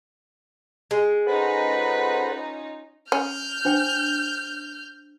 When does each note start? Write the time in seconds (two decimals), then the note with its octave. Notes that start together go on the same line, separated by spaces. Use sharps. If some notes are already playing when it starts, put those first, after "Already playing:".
0.91 G#3
1.27 C#4 D#4 F4 A4 B4 C5 F#5
3.12 C#4 F6 G6
3.65 D4 C5 G5